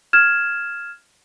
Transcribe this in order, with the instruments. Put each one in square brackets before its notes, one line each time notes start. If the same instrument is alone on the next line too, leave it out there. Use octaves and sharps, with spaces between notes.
[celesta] F6 G#6 E7